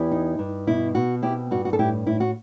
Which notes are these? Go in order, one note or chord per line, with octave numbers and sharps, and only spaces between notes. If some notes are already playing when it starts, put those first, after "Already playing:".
Already playing: E2 E4 G4
D#4
G2
B2 E4
B2 F#4
C4 E4 G4
G2 F#4
F#4
A4
A2 E4 G4
A2 E4
F#4